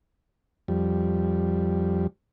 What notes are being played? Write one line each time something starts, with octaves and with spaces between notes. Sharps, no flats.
F2 G3